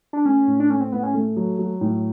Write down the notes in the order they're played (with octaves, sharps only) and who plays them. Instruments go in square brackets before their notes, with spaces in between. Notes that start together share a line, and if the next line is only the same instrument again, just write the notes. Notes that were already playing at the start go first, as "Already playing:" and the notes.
[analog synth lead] D4
[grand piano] A3 [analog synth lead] C#4
[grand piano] A2
[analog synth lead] D4
[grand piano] A3 [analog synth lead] C#4
[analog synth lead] C4
[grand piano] A2 [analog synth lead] B3
[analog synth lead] C#4
[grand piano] A3
F#3
F#3
A2